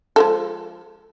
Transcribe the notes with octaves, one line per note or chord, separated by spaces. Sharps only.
F3 G#3 A4